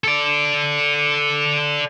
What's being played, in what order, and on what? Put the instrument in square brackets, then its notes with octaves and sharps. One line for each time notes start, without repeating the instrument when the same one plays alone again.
[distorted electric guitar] A4 D5